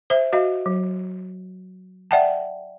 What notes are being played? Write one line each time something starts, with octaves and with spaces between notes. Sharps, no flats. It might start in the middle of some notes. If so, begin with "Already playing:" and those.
C5 E5
F#4 D#5 F5
F#3
D5 E5 F#5 G5 A5